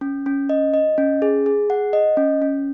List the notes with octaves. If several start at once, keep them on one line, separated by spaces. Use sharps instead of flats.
C#4
C#4
D#5
D#5
C#4
G#4
G#4
F#5
D#5
C#4
C#4